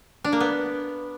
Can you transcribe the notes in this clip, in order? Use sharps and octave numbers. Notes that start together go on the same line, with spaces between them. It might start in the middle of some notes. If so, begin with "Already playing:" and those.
D4
A#3
B3